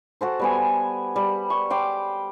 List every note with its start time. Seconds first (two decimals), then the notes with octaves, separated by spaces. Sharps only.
0.21 F#4 A4 C5
0.39 G3 B3 G#5
1.16 G3
1.50 C#6
1.70 G5 C6 D6